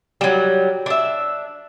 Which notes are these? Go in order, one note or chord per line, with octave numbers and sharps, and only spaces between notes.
F#3 G3
D4 E5